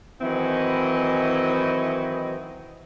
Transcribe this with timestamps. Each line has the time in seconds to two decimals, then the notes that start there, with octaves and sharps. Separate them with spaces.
0.21 D#3 E3 F#3 C4 E4 D#5